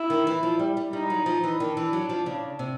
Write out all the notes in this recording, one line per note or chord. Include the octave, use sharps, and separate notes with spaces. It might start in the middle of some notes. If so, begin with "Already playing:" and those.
Already playing: E4
D#3
E3
F3
G3
G3
G3 D#4
F#3
F3
E3
D#3 D4
E3
F#3
F3
C#3
C3